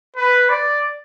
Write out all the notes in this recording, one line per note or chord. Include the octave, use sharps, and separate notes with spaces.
B4
D5